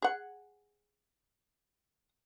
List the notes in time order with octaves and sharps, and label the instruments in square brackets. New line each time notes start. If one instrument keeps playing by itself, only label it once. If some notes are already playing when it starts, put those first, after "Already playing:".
[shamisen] G#4 F#5